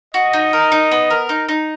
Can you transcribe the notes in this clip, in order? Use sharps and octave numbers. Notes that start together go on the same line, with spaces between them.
F#4 D#5
D#4
A#4
D#4
B3
A#4
D#4
D#4